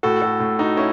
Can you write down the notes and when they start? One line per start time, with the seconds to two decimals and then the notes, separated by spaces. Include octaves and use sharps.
0.03 A2 F#4 A4
0.22 F#4 A4
0.40 A2
0.59 D#4 F#4
0.77 C#4 E4